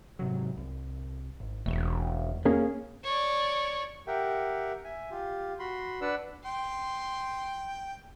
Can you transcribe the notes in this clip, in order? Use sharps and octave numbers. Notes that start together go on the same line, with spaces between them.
G#2 C3 F#3
C2
G#1
E1 E2 A3
A#3 C#4 G#4
C#5 D5
G4 A#4 E5 F#5 G5
E5 G#5
F4 G4
F#4 B5 C6
D4 B4 D5 F#5 E6
G5 C6